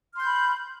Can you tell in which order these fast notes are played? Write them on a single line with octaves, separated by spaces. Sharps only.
F6 C6 G6 B5